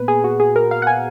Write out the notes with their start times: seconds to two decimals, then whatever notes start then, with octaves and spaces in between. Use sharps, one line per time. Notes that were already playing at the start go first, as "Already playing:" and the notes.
Already playing: A#2 B3 B4
0.08 G#4
0.24 F#4
0.40 G#4
0.56 A#4
0.71 F5
0.82 F#5
0.87 G#5